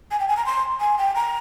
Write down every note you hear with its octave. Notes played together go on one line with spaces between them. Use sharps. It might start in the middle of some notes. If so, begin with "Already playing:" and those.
G#5
G5
G#5
A#5
C6
G#5
G5
A#5